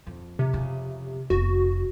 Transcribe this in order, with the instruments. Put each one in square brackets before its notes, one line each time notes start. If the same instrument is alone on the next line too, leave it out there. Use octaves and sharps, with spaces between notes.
[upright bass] F2
[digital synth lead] C3
[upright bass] F2 C#3
[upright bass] F1 B3 [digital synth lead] F#4